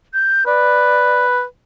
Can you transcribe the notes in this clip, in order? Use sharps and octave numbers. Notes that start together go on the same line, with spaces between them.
G6
B4 D5